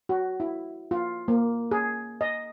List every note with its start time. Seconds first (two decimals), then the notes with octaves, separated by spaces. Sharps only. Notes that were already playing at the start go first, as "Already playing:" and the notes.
0.09 F#4
0.40 E4
0.91 F4
1.28 A#3
1.71 G#4
2.21 D#5